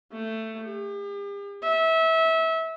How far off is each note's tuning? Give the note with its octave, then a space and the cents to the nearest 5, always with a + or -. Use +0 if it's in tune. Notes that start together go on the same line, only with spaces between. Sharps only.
A3 +15
G4 +45
E5 -25